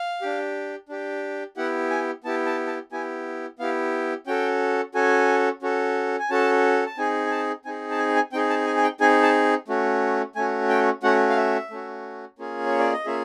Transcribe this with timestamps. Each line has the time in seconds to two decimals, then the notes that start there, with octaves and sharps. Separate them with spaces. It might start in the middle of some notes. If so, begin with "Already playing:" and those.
Already playing: F5
0.22 D4 G4
0.89 D4 G4
1.57 B3 E4 G4 F#5
1.90 G#5
2.24 B3 E4 G4 A5
2.46 A5
2.67 A5
2.92 B3 E4 G4 G#5
3.59 B3 E4 G4 F5
4.27 C#4 F#4 A4 G5
4.95 C#4 F#4 A4 G#5
5.62 C#4 F#4 A4
6.19 G#5
6.30 C#4 F#4 A4 A5
6.86 A5
6.97 C4 D#4 G#4 G#5
7.26 G#5
7.31 A5
7.65 C4 D#4 G#4 G#5
7.91 A5
7.98 G#5
8.16 G#5
8.33 C4 D#4 G#4 G5
8.50 A5
8.67 G#5
8.77 G#5
8.84 G5
9.00 C4 D#4 G#4 G#5
9.23 A5
9.68 A3 C#4 F#4
10.36 A3 C#4 F#4 G#5
10.69 G5
11.03 A3 C#4 F#4 F#5
11.30 F5
11.37 E5
11.70 A3 C#4 F#4
12.39 A#3 C#4 F4 G#4
12.66 C#5
12.79 D5
12.93 D#5
13.06 A#3 C#4 F4 G#4 E5